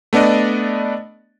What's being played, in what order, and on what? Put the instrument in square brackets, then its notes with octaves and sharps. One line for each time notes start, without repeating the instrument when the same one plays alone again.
[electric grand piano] A3 B3 D4 D5 D#5